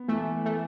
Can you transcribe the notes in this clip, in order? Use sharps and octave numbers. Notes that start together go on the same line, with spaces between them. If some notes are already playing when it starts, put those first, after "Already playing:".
Already playing: B3
E3 A3
A3